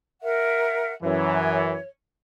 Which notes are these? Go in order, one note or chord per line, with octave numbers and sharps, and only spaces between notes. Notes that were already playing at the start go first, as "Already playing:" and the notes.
A#4 E5 F#5
F#2 E3 C#5